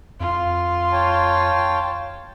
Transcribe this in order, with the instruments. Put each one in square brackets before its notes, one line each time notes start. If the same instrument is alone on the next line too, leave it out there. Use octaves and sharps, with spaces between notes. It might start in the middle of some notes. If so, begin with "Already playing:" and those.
[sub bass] F2 [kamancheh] F4
[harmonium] C#5 G5 A5